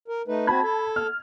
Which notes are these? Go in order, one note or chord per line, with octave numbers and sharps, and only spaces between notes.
A#4
A3 D#4 B4
C4 F#4 A5 B5 G#6
A4
F6